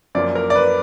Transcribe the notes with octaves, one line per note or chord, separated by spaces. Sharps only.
F#2 F3 A#3 D5
A#4
D5
B4